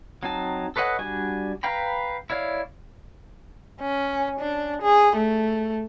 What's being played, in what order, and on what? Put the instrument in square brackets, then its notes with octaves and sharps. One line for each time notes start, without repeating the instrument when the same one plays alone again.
[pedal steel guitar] F#3 C4 D#4 A5
A4 B4 C#5 D#5 F#5
G3 D4 F#4 G#5
B4 F5 G5 A#5 B5
E4 C#5 D5 F5
[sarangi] C#4
D4
G#4
A3